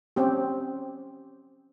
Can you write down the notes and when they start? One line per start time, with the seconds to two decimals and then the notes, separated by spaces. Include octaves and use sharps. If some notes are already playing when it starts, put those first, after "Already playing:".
0.16 C4 C#4 G4